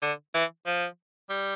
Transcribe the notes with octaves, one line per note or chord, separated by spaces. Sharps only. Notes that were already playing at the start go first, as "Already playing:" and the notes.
D3
E3
F3
G3